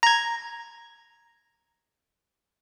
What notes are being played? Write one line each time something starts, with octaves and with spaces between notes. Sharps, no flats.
A#5 G#6